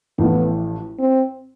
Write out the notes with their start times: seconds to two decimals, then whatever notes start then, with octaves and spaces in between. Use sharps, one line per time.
0.19 A1 A2 F3 A3 B3
0.99 C4